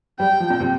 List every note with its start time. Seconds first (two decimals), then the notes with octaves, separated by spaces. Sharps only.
0.20 G3 G5
0.40 F3
0.50 A#2
0.60 C3